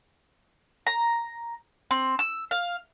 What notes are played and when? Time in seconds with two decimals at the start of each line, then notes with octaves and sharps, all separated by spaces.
0.87 A#5
1.91 C4
2.19 E6
2.51 F5